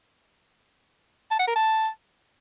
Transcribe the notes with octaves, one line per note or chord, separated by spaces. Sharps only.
A5
F#5
A#4
A5